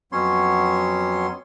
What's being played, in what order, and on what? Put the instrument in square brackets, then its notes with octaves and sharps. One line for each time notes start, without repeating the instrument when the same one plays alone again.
[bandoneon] F2 F#3 B3 C#4 C#5 C6